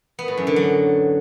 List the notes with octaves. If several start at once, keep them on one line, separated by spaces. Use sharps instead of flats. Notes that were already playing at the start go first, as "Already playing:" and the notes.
B3
A2
F#2
D3
F#3